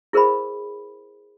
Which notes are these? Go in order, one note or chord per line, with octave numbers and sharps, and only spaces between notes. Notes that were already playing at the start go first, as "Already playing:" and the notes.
E4 G#4 A#4 C5 D#5 B5